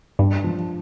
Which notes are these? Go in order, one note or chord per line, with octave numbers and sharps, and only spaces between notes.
G2 D4
F3